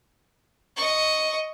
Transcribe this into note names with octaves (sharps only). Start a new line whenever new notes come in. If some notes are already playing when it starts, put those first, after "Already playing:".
D#5 C#6